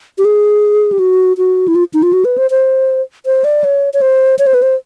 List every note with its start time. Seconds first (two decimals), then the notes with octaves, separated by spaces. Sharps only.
0.18 G4
0.25 G#4
0.92 G4
0.99 F#4
1.38 F#4
1.68 E4
1.75 F4
1.94 D#4
2.03 F4
2.13 F#4
2.25 B4
2.38 C5
2.51 C5
3.26 C5
3.44 D5
3.64 C#5
3.94 C#5
4.01 C5
4.39 C#5
4.47 C5
4.54 B4
4.62 C5